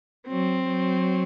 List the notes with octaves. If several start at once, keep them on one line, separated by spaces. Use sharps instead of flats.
F#3 C4
F#3